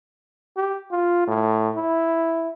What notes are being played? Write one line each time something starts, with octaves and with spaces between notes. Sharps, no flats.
G4
F4
A2
E4